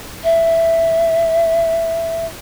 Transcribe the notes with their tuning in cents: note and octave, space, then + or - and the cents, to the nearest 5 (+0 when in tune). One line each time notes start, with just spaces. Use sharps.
E5 +5